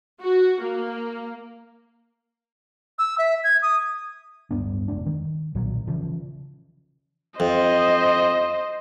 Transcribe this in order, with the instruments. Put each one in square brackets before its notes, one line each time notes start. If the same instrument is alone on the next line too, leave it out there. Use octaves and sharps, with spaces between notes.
[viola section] F#4
A#3
[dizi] E6
E5
G#6
D#6
[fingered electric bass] D1 G2 B3 D4
F1 G#3 D4
D#3
B1 A#2 F#3
C#3 E3 F3
[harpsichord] F2 [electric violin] C5 D#5